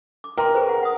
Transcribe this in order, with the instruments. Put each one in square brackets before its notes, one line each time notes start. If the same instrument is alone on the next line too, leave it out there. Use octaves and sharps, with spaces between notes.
[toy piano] D6
[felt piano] A#4 [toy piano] G5 A#5 C6
[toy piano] G#4 B4 C5
F#5
F#5 D#6